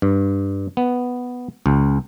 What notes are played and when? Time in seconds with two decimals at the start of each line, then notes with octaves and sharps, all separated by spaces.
0.02 G2
0.77 B3
1.66 C#2